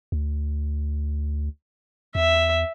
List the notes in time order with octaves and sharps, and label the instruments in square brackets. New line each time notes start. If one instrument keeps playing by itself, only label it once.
[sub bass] D2
[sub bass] E2 [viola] E5